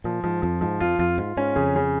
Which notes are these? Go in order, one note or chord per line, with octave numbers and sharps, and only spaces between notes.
A#2 F3
G#2 F3
F2 F3
G#2 F3
F2 F4
F2 F4
G#2 F4
G#2 C#4
F2 C#3
C#3